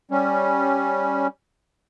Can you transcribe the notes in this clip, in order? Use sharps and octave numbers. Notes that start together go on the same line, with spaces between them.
G3 C#4